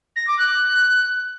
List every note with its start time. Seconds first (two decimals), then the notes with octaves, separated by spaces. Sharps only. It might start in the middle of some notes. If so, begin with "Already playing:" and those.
0.16 A#6
0.27 D6
0.39 F#6